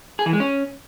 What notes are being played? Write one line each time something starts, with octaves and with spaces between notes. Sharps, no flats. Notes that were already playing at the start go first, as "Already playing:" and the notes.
G#4
E3
G#3
C#4